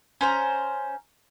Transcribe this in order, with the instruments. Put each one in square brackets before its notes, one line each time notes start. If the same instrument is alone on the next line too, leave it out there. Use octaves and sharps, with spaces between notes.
[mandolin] C#4 C5 A#5